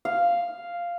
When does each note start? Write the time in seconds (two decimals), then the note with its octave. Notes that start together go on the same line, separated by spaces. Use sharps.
0.05 F5